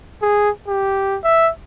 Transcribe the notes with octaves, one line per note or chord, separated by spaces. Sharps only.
G#4
G4
E5